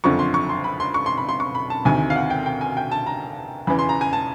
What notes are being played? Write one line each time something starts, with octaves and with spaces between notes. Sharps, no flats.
F#1 F2 D3 F3 C#6
C6
C#6
C6
B5
C6
C#6
C6
B5
C6
C#6
B5
A5
D2 C3 D#3 G#5
F5
F#5
G5
G5
G#5
G5
A5
A#5
E2 C#3 E3 B5
C6
A#5
G#5
A5